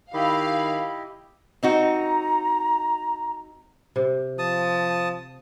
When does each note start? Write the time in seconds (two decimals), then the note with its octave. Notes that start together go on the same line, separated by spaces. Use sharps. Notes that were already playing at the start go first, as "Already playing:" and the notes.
0.13 D#3 E4 G4 D#5 F5 B5
1.63 C4 D#4 F#4 A#5
3.96 C3
4.39 F3 A5 D#6